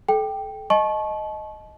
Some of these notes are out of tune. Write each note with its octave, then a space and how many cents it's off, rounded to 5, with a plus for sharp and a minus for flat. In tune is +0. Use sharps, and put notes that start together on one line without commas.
A4 -30 G5 +0
D#5 +0 A5 -35 C#6 -25